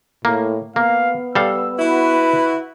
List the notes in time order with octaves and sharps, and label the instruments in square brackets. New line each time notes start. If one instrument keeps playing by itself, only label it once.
[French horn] A2 [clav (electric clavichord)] A#3
[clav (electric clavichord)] A#3 [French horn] B3 [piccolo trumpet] F5
[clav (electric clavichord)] G3 A4 F5 [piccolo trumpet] E6
[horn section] E4 F#4 [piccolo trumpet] B4